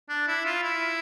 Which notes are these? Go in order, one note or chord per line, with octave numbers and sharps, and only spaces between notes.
D4
E4
F4
E4